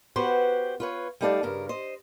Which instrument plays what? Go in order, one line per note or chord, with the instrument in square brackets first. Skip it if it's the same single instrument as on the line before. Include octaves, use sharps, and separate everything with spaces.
[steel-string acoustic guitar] B3 F#4 G4 B4 C5
F4 B4 C#5
G3 A3 D#4 A4 D5 F5
G2 C#3 A#4
C5 D#5